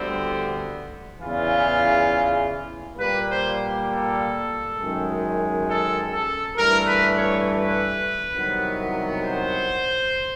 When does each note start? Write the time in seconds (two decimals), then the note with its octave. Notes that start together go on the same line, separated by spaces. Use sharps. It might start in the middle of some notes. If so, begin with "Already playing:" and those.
Already playing: D2 D3 G3 B3 C4
1.19 E2 C#3 E3 F4
2.98 A#2 G3 A#3 B4
3.28 C5
3.87 A4
4.76 F#2 D#3 G#3
5.66 A4
6.11 A4
6.56 G2 E3 A3 A#4
6.85 B4
7.16 C#5
7.45 B4
8.35 C2 C3 D#3 F#3 B3
9.23 C5